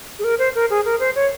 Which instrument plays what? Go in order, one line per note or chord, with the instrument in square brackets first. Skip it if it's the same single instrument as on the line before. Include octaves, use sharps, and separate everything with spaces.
[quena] G#4
A#4
C5
A#4
G#4
A#4
C5
C#5